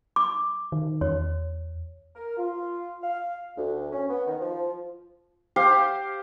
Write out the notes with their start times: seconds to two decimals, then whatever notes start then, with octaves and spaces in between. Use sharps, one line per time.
0.16 D6
0.72 D#3
1.01 E2 C#5
2.16 A#4
2.38 F4
3.03 F5
3.57 D2
3.92 C#4
4.10 B3
4.27 D#3
4.41 F3
5.56 G4 C5 F5